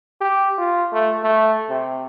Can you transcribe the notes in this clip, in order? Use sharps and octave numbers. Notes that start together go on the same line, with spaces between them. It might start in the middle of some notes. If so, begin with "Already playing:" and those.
G4
F4
A3
A3
C3